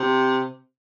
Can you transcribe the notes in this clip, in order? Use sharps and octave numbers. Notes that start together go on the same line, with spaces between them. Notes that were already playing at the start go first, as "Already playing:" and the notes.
Already playing: C3